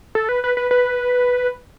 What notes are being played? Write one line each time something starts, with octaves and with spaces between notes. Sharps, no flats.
A4
B4
B4
B4
B4